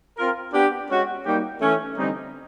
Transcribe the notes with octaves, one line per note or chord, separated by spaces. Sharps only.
C4 F4 A#4
B3 D4 G4
G#3 C#4 F#4
G3 A#3 D#4 G4
E3 A3 C#4
D3 G3 C4 D#4